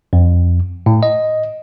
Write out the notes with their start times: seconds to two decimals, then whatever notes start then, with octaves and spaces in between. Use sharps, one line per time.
0.13 F2
0.86 A2
1.03 D#5